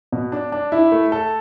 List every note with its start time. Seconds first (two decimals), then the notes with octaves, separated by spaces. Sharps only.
0.12 B2
0.32 D4
0.52 D4
0.72 E4
0.92 A3
1.12 A4